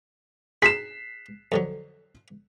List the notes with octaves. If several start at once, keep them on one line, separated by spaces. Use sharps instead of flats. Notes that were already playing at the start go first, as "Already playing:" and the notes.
G#4 B5 B6 C7 E7
F2 D3 F#3